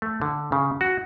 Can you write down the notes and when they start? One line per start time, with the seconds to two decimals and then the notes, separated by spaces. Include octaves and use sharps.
0.02 A3
0.22 D3
0.52 C#3
0.81 F#4